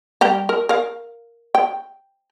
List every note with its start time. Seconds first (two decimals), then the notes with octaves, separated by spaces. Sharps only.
0.21 G3 G4 A#5
0.49 A#4
0.69 A#4 F5
1.55 G5